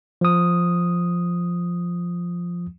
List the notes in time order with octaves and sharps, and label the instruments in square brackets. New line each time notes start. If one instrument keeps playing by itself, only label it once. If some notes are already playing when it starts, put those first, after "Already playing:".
[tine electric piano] F3 D#6